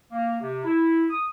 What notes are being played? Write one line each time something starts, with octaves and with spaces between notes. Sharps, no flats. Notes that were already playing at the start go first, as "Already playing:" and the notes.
A#3
C3
E4
D#6